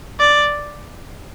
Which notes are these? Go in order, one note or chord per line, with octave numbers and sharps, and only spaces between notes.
D5